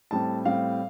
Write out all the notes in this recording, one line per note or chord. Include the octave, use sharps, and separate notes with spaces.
A2 G3 C4 A5
A2 G3 C4 F5